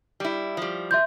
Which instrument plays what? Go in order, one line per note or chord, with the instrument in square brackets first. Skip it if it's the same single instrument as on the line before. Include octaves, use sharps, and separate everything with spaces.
[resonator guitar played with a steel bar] G3 E4
F3 G3
[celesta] E5 C6 G6